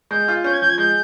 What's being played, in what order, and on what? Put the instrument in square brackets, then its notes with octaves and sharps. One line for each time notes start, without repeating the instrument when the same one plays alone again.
[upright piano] G#3 [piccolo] G6
[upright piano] F4
[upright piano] C#4 [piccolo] G6
[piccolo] G#6
[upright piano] F3 [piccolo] G6
[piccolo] G#6
[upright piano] G#3 [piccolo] G6